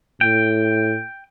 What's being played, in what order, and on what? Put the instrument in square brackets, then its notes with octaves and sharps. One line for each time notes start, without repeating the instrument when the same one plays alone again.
[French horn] A2 [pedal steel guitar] G5